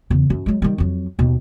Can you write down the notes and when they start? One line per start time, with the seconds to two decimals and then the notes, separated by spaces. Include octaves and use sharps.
0.10 E2 C#3
0.30 F#2
0.46 F#3 G#3
0.62 D#3 G3
0.78 F2 F#3
1.19 D#2 B2